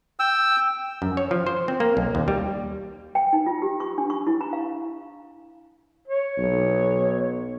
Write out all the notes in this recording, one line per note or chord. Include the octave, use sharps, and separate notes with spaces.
G5 E6
F#2
C#5
F3
C5
C4
A#3
B1
D#2
G3
G5
D#4
F4
G4
C#6
D4
C#6
E4
A#5
F5
C#5
B1